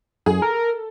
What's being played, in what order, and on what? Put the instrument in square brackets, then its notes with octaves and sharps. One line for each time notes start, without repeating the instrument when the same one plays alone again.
[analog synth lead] F#2 [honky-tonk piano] G#4
[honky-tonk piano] A4 [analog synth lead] A#4